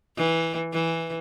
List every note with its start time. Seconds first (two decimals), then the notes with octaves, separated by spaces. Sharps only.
0.16 E3
0.73 E3